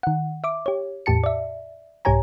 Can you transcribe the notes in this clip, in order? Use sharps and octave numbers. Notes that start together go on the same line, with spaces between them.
D#3 F#5
E5 D6
G4 C#5
E2 A2 G4 A5 C#7
D5 E5
C2 G#2 G4 C#5 G#5 A#5